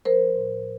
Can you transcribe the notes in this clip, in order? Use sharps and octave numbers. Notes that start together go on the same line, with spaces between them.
F3 A#4 C5
A2